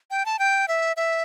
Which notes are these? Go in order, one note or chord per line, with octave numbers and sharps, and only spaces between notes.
G5
A5
G5
E5
E5